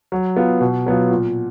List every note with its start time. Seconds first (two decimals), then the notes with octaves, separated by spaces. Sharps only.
0.12 F#3
0.37 B3 F4
0.61 B2
0.86 F#3 B3 F4
1.11 A#2